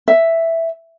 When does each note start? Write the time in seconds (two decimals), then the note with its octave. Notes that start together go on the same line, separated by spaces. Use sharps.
0.08 E5